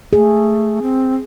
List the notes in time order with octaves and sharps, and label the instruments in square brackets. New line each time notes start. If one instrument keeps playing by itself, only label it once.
[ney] A3 [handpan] G#4
[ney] C4